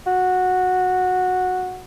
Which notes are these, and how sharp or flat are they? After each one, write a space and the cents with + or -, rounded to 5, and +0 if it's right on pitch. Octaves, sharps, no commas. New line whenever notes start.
F#4 -10